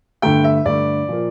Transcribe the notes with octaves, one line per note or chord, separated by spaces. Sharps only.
G2 D3 A3 G5
E5
G2 D3 A3 D5
A#2 F3 A#3